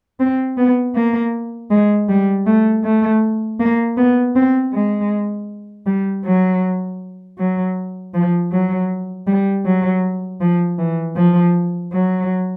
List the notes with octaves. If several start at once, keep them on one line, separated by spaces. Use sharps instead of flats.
C4
B3
A#3
G#3
G3
A3
A3
A#3
B3
C4
G#3
G3
F#3
F#3
F3
F#3
G3
F#3
F3
E3
F3
F#3